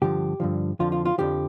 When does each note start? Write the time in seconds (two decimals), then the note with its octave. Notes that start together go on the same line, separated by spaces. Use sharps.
0.02 G2 D3 F3 G4
0.40 G2 D3 F3
0.79 F2 D3 F3 F4
0.92 F4
1.05 F4
1.18 F2 D3 F3 G4